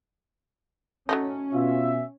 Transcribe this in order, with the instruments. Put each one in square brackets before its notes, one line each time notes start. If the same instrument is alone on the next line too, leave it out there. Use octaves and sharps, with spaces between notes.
[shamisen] F#3 A3 D#4 [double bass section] C#4
[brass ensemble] B2 E5 [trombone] F4